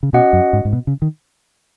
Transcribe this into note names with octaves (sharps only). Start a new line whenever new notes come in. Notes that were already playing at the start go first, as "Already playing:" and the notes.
C#3
B2 C#4 F#4 D#5 F#5
F#2
G#2
G#2
B2
C#3
D#3